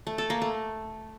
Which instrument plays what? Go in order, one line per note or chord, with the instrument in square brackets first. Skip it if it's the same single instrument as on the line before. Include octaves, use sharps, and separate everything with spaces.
[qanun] A3
A4
A#3
A3